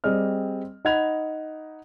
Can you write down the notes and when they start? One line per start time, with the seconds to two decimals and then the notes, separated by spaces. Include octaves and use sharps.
0.04 G3 C4 G#4 D5 D#5 F6
0.85 D#4 D#5 F#5 B5 G#6 F7